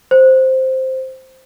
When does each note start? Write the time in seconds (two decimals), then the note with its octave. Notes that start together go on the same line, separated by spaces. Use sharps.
0.11 C5